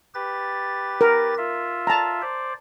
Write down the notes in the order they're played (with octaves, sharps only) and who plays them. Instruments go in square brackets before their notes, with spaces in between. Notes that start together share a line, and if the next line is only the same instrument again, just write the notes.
[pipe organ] G4 B4 A6
[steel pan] A#4
[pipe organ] F4 E5
[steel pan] A5 A#5
[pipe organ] C5 D5